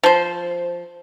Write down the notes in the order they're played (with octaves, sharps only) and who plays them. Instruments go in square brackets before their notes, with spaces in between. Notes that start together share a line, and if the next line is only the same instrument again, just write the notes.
[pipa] F3 C5